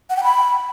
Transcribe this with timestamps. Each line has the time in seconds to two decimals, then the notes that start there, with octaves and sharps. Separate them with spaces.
0.10 F#5
0.16 G5
0.23 B5